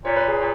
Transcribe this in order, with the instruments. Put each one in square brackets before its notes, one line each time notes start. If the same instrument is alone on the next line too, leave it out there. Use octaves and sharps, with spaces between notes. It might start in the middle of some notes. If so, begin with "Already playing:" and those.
[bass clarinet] A#2 [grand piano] C#5
[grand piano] B4
G#4
[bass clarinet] A#2